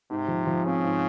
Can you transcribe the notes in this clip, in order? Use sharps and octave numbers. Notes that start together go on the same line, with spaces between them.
G#2 C3
F3
F3
C#3 C4
G#2